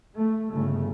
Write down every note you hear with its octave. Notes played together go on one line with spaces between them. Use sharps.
A3
G1 C#3 A3